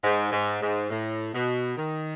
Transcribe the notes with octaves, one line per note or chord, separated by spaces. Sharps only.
G#2
G#2
G#2
A2
B2
D#3